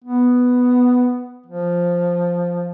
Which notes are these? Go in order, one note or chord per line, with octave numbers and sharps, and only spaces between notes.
B3
F3